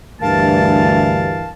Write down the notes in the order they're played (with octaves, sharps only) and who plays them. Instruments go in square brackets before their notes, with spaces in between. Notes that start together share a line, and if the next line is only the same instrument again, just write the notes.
[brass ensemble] D2 G2 E3 [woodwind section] A#4 F5 A5